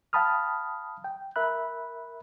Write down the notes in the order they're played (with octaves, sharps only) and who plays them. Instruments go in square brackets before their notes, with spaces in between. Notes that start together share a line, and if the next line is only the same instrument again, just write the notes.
[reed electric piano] F5 G5 A5 B5 D#6 F6
G5
A#4 E5 B5 F#6